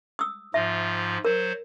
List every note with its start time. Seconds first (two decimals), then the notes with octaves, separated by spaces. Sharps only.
0.19 D#6 E6
0.54 G#2 F3 F4 E5
1.25 F#3 A#4 C5